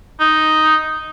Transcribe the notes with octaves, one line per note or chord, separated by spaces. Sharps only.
D#4